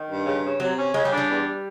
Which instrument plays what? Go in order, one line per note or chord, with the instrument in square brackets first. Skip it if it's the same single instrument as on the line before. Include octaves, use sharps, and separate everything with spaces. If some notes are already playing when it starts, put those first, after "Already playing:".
Already playing: [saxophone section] D#3
G2
C#3
C#3
[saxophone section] C3 [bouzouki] F#3
[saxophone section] C#4
[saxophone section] C#3 [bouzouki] G#3
[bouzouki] G3
[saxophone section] D4
[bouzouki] G3
[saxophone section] E2